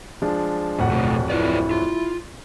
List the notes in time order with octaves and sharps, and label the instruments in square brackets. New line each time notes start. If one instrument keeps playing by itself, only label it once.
[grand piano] F3 G#3 D4
[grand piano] D1 F2 F#5 [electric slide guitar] A2
[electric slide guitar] B2 A3
[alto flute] E4 [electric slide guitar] F4 B4 D5
[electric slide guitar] F4